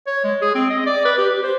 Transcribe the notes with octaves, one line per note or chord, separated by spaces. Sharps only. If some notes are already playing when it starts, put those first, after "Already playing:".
C#5
G#3
G#4
C4
D#5
D5
B4
G4
G4
C5